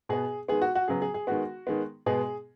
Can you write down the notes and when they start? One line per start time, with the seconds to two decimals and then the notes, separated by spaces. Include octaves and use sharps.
0.09 B2 B3 G#4
0.48 D#3 G#3 B3 G#4
0.62 F#4
0.75 F#4
0.88 C#3 F#3 B3 G#4
1.02 G#4
1.14 G#4
1.27 D#3 G#3 B3 F#4
1.67 D#3 G#3 B3
2.06 B2 G#3 B3 G#4